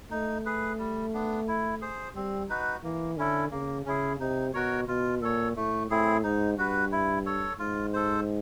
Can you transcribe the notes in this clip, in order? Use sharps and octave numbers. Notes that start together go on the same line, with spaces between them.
A3 D#4
G#4 B4
G3
B3 D4
E4
G#4 C5
G3 C4
D#4 F#4 B4
E3 A#3
D3 C#4 E4 A4
C#3 A#3
C#3 C#4 E4 G#4
C3 D#4
B2 F#4 A#4 C#5
B2 F4
A#2 A4 C#5
A2 A3
A2 C4 E4 G#4
G#2 D#4
G2 F#4 B4
E4
A4 C#5
G#2 F4
A4 C5